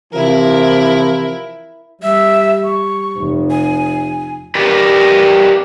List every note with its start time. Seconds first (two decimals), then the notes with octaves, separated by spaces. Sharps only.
0.12 C3 E3 F3 E4 A#4
2.03 G3 E5
2.64 C#6
3.17 F1
3.50 G#5
4.55 G4 A#4 B4 D5